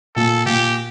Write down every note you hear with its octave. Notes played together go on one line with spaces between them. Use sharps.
A#2 A4
A#2 G4